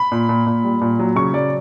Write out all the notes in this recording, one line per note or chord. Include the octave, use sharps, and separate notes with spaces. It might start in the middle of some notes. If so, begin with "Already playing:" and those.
Already playing: B5
A#2
A#2
A#2
G3
A#2
F#3
C#3 C#6
F#3 D5